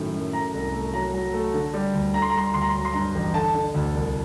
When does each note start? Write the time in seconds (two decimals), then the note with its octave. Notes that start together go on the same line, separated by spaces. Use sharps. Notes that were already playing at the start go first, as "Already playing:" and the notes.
Already playing: F#2 A2 D#3
0.13 F#2
0.33 A3 A#5
0.54 C2
0.73 A3
0.94 F#3 A#5
1.14 F#3
1.34 A3
1.54 D3
1.74 G3
1.94 D2
2.14 D3 A#5
2.22 C6
2.30 A#5
2.34 G3 C6
2.46 A#5
2.54 D2 C6
2.62 A#5
2.69 C6
2.75 F#3 A#5
2.85 C6
2.93 G2 A#5
3.15 A1
3.34 D3 A5
3.54 D3
3.74 D2
3.94 C2